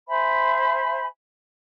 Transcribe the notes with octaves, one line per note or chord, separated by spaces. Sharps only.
C5 E5 G#5 B5